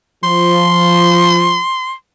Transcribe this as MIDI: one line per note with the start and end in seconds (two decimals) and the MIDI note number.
0.24 1.59 53
0.24 1.93 84